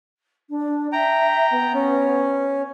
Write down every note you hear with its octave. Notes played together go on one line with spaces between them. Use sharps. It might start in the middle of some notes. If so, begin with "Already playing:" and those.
D4
E5 G5 A#5
B3
C#4